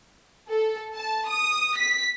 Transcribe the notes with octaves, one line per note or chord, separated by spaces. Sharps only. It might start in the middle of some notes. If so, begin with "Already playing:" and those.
A4
A5
D#6
B6